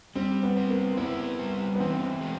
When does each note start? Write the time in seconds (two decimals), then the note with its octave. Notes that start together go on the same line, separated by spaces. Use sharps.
0.15 G3 C4
0.43 B3
0.57 C4
0.70 A#3
0.97 B3 E4
1.39 G3
1.75 B3
1.80 E3 C4
2.21 G#3